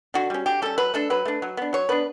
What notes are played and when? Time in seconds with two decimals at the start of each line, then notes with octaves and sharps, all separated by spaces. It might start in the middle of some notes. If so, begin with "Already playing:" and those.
0.14 D3 F#4
0.30 G3 C#4
0.46 D3 G4
0.62 G3 C#4 A4
0.78 F#3 B4
0.94 A3 D4 A4
1.10 F#3 B4
1.25 A3 D4
1.42 F#3
1.57 B3 D4
1.73 F#3 C#5
1.89 B3 D4 B4